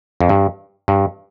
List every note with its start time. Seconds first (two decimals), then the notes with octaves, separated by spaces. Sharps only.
0.21 F2
0.29 G2
0.88 G2